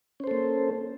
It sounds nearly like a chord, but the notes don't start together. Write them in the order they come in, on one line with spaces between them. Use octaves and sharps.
C#4 C5 A4 A#3